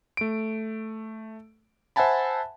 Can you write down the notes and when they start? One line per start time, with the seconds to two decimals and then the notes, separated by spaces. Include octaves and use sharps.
0.17 A3 D7
1.96 C5 E5 F#5 G#5 A5 B5